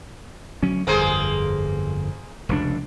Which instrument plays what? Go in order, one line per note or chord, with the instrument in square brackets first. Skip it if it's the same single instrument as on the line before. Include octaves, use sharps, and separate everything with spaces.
[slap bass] D2 F#3 C#4
[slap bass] G1 F2 [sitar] A#3 G#4 C5
[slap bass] F1 C#2 D4